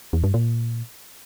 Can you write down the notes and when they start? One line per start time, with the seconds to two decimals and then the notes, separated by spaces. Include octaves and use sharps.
0.13 E2
0.24 G2
0.34 A#2